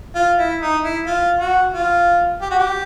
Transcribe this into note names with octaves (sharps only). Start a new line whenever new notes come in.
F4
E4
D#4
E4
F4
F#4
F4
G4
F#4
G4